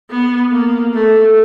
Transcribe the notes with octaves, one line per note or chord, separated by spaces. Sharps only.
B3
A#3
A3